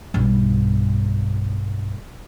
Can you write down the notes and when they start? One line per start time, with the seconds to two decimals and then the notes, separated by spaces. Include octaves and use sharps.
0.14 B1 G2